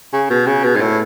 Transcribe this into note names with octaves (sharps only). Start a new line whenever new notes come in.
C#3
B2
C#3
B2
G#2
A2